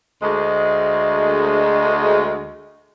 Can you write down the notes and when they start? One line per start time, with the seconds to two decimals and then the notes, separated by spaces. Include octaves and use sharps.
0.22 D2 G#3